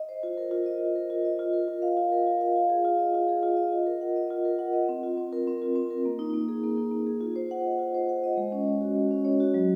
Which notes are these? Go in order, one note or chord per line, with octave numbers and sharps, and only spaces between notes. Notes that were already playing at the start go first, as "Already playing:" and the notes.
Already playing: D#5
C5
F4
A#4
F4
D#5
F4
A#4
F4
D#5
F4
A#4
F4
F5
F4
A#4
F4
F5
F4
G#4
F4
D#5
F4
G#4
F4
D#5
F4
A#4
F#5
D#5
F4
A#4
F#5
D#5
C4
F4
C4
A#4
C4
F4
C4
A#4
A#3
D#4
A#3
G#4
A#3
D#4
A#3
G#4
F4
C5
F#5
D#5
F4
C5
F#5
D#5
G#3
C#4
C#5
F#4
G#3
C#4
C#5
F#4
F#3